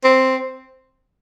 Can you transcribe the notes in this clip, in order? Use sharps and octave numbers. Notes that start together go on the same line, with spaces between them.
C4